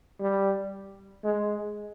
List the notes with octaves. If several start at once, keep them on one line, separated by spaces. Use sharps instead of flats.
G3
G#3